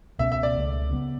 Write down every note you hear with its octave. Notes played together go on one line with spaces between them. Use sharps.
C#2 B2 A3 C#4 E5
E5
D5
C#2 C#3 E3 A3
C#3 E3 B3